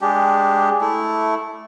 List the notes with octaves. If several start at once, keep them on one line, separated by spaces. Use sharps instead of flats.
G#3 D4 G4
A3 E4